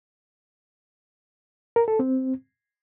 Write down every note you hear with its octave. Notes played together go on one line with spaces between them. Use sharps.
A#4
A4
C4